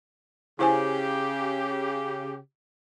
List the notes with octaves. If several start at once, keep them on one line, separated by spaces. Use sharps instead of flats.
C#3 E4 G4 C5 G#5